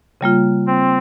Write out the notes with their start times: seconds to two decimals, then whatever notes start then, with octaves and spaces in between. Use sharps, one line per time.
0.21 C#3 G3 A#3 F4
0.67 C4